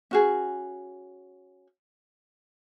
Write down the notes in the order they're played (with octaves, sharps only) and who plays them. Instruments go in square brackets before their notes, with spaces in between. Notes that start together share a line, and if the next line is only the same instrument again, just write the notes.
[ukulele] C#4 F#4 G#4